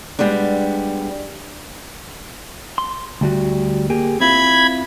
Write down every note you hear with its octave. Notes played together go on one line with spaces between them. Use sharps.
G3 G#3 B3 D4
C6
D2 G3 F#4
A#3 G4 G#4
C4 E4 F4 B5 G#6